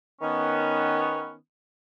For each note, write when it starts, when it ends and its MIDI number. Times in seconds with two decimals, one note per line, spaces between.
0.22 1.34 51
0.22 1.34 59
0.22 1.34 61